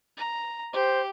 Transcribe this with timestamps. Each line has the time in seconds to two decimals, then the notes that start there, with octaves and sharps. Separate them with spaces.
0.17 A#5
0.73 G4 C5